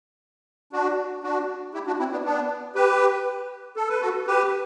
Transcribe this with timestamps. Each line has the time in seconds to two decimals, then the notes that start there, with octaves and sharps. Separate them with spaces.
0.73 D4 F#4
1.23 D4 F#4
1.74 E4 G4
1.87 D4 F#4
1.99 C4 E4
2.12 B3 D4
2.24 B3 D4
2.75 G4 B4
3.77 A4
3.89 B4
4.01 F#4 A4
4.27 G4 B4